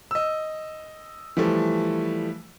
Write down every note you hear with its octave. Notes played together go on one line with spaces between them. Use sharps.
D#5 E6
E3 F3 G3 A3